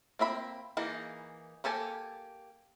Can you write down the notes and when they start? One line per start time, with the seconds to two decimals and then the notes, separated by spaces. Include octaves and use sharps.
0.19 A#3 C4 E5 B5
0.77 E3 A#3 D#4 G#4
1.64 A#3 G4 A4 G#5